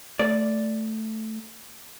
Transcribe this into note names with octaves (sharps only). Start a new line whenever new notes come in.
A3 D5